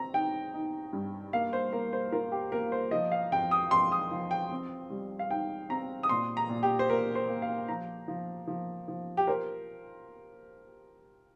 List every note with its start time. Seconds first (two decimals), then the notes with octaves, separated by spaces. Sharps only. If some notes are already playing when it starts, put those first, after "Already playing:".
Already playing: C4 A#5
0.14 D#4 G5
0.54 D#4
0.93 G2
1.33 A#3 F5
1.53 C5
1.73 A#3 A#4
1.93 C5
2.12 F4 A#4
2.32 G4
2.52 A#3 A#4
2.72 C5
2.91 F3 D#5
3.12 F5
3.32 F2 G5
3.51 D#6
3.71 F2 C6
3.92 D#6
4.11 F3
4.31 G5
4.51 C4
4.90 G3
5.19 F5
5.30 D#4 G5
5.69 C4 A#5
6.03 D#6
6.09 A#2 C6
6.37 A#5
6.49 A#2
6.63 G4
6.79 C5
6.90 A#2 A#4
7.15 C5
7.28 A#3
7.42 F5
7.68 F3 A#5
8.08 F3
8.47 F3
8.88 F3
9.17 G4
9.27 A#4 C5